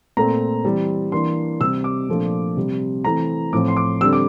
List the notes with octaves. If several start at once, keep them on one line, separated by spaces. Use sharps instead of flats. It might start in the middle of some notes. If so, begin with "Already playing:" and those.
A#2 A3 C4 A#5
E3 G3 C4
E3 A#3 D4 C6
C3 G3 C4 E6
D6
A#2 F3 A3 D4
C3 G3 C4
E3 A3 C4 A#5
A2 F3 C4 D6
C6
D6
D3 G3 C4 E6
D6